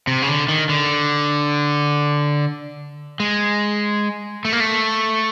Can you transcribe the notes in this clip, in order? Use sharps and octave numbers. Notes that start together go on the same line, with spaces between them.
C3
C#3
D3
D#3
D3
G#3
A3
A#3
A3